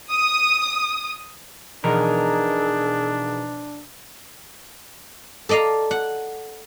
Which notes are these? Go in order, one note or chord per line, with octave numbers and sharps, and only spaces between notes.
D#6
B2 E3 F3 D4 D#4 G#4 A#4
A4 D5 D#5 F5 A#5
F#5